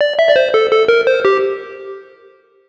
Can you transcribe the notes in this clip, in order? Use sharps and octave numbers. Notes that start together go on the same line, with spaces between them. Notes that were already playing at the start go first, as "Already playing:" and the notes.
D5
E5
D5
C5
A4
A4
A#4
C5
G4